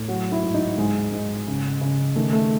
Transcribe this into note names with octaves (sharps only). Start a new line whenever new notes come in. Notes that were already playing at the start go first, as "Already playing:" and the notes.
Already playing: A2
F#3 F#4
E4
G#2
D#4
G#2 G#3
G#2
C#3
C#3
D#3 A3
A3